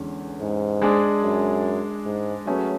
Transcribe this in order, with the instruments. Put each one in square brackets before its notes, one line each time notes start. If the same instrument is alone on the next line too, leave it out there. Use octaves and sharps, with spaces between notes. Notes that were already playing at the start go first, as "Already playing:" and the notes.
Already playing: [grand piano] E2 D3 G#3 C#4
[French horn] G#2
[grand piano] G#3 D4 G#4 D5
[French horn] F#2
G#2
[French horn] F#3 [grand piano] A3 C#4 G#4 B4